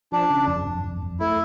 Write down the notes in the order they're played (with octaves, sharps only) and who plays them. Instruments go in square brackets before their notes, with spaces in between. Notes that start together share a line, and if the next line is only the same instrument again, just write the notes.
[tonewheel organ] F3 [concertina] D4
[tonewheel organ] C#3
F2
F2
F2
F2
[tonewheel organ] A3 [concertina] E4